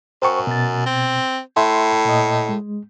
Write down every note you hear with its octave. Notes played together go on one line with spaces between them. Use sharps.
F#2 C5 G5 C#6
B2 A6
C4
A2 E5 C6
A#2 D#5
G#3